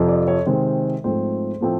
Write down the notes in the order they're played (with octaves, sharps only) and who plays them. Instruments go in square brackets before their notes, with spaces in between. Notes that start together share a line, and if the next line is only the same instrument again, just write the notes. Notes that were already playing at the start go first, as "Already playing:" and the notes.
Already playing: [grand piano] F2 C3 F3
D5
C#5
C3 D#3 G#3 C4 C5
G#2 F3 A3 C4 C5
A2 F3 A3 C4